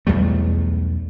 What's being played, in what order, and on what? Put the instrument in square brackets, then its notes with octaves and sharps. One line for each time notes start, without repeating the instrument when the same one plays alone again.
[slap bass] B1 E2 G3 A3